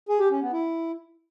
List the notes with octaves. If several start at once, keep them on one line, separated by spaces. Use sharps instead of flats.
G#4
G4
C#4
B3
E4